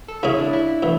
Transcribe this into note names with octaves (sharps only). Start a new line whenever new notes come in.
A4
C#3 G#3 C#4 E4 G#4
D4
E4
A2 E3